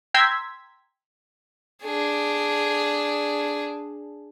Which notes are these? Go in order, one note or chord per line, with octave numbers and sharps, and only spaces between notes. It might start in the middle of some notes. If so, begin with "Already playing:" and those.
G5 A#5 C6 E6 G#6 B6
D4 G#4